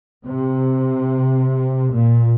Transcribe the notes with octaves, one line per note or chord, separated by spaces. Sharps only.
C3
A#2